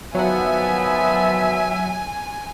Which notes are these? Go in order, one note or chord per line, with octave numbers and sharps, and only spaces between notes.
D#3 F3 F#3 B3 E5 F#5 G#5